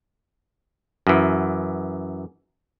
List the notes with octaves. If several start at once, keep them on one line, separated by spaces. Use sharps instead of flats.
F#2 E3